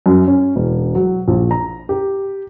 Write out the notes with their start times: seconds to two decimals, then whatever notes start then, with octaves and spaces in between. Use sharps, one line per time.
0.06 F#2
0.28 C#4
0.56 E1
0.95 F#3
1.28 A#1
1.51 A#5
1.89 G4